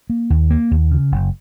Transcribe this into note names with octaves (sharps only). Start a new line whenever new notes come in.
A#3
D#2
A#3
D#2
C#3
F#1